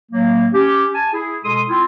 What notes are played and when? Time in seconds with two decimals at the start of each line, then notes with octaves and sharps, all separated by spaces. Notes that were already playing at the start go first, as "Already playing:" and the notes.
0.12 A2 F#3 A#3
0.54 C#4 G4
0.94 G#5 A5
1.13 E4 G#4
1.45 B2 G#3 A4 C6 D#6
1.69 C4 E4 F4